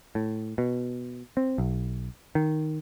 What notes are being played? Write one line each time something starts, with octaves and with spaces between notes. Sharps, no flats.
A2
B2
C4
B1
D#3